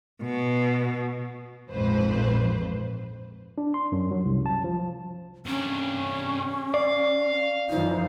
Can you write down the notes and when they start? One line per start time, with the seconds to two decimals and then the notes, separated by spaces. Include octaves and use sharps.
0.23 B2
1.71 A#1 F2 G#2 B4 C5
3.58 D4
3.74 C6
3.92 F#2
4.11 F#3
4.25 C2
4.46 A5
4.64 F3
5.46 C3 C#4 D4
6.74 D5 F5
7.70 F#2 E3 F3 D#4